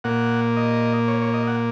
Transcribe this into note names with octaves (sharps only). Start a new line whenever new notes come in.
A#2 A#3 F#5
D#5
C#5
C#5
D#5
F#5